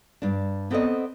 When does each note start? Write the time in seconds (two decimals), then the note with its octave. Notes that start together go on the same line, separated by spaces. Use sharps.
0.22 G2 D4
0.71 B3 C4 A4 A#4 D5 D#5